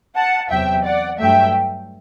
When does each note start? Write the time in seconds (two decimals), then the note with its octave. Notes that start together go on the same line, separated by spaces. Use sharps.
0.15 F#5 A5
0.50 E2 C3 F#3 E5 G5
0.84 D5 F#5
1.19 G2 F#3 A3 E5 G5